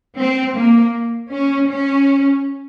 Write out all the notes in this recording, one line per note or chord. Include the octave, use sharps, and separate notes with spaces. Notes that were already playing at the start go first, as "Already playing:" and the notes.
C4
A#3
C#4
C#4